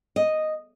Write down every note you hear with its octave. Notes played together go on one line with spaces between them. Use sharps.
D#5